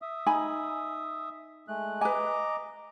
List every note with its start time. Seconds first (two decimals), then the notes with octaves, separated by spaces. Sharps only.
0.02 E5 D#6
0.26 D#4 G#5 B5
1.68 G#3 A3 F#6
2.01 B4 D#5 G#5 A#5 D6